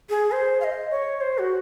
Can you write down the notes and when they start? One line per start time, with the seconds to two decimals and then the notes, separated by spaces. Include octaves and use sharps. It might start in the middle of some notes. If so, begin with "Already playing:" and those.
0.10 G#4
0.32 C5
0.61 F5
0.64 D#5
0.91 C#5
1.21 C5
1.38 F#4